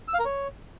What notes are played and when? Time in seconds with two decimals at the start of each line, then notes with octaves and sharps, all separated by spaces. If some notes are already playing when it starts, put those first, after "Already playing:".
0.08 E6
0.14 F5
0.20 A#4
0.25 C#5